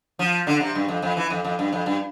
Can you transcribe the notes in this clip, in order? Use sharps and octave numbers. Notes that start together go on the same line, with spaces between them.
F3
D3
C3
G2
F2
F2
E3
F2
F2
G2
F2
G2